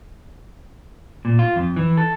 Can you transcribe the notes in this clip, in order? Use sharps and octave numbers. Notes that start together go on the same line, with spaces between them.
A#2
F4
F2
E3
A4